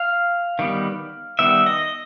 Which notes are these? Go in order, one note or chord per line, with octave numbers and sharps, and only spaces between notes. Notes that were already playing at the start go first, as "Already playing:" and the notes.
Already playing: F5
D#3 G3 B3
D#3 G3 B3 E5
D#5